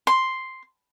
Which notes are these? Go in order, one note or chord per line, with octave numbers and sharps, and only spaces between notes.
C6